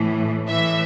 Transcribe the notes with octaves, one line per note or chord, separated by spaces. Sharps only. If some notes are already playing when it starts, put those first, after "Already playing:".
Already playing: A2 E3
A2 E3 E5